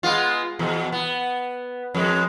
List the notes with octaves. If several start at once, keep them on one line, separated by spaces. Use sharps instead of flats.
G#3 B3 F4
E2 B2
B3
F2 G#3